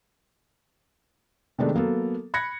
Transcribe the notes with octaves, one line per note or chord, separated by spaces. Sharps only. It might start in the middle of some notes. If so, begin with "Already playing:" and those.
C3 D#3 G#3 A3 B3 D4
F#3 A#3 B3 A4
B5 F#6 G#6 A#6 C#7